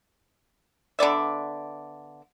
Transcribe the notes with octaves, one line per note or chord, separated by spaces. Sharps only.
D3 B3 D5 E5